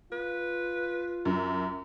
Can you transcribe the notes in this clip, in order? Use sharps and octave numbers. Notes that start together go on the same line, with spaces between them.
F4 B4
F#2